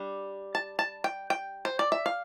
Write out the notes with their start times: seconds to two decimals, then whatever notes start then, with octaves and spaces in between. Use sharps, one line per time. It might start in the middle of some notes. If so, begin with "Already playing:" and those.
Already playing: G3 D4
0.55 A5
0.79 A5
1.04 G5
1.30 G5
1.65 C5
1.79 D5
1.92 E5
2.06 F5